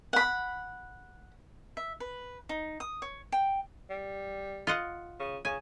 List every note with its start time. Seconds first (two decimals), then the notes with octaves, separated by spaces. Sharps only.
0.13 F#5 B5
1.77 E5
2.00 B4
2.49 D#4
2.80 D#6
3.02 C#5
3.32 G5
3.90 G3
4.67 F4 D#5 F#5
5.20 C#3
5.45 C#3 G#5